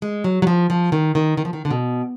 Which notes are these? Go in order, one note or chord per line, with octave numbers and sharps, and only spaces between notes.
G#3
F#3
F#3
F3
F3
D#3
D#3
D#3
F3
D#3
D3
B2